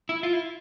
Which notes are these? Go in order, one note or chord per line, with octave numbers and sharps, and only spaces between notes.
E4
F4
E4